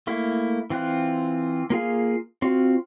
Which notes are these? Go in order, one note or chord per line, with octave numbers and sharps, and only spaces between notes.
A3 A#3 E4
E3 C4 F4 F#6
A#3 F4 G#4 F5
C4 F4 F#4